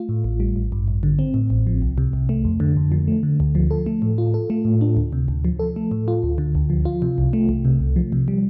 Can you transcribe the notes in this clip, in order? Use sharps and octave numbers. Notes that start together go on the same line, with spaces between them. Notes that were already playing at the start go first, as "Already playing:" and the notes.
Already playing: A3 F4
A2
A1
G3
A1
G2
A1
D3
C4
A2
A1
F3
C2
C3
C2
A3
F2
D3
F2
F3
A3
D3
D2
F3
A4
A3
A2
F4
A4
A3
A2
D4
D2
C3
D2
F3
A4
A3
A2
F4
D2
D3
D2
F3
F4
C3
C2
A3
C2
C3
C2
F3
C3
G3